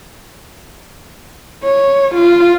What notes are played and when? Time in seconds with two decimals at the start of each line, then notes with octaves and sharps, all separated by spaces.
1.64 C#5
2.15 F4